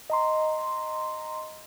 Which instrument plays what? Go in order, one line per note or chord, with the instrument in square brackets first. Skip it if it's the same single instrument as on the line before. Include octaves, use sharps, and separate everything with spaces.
[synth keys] D#5 A#5 C6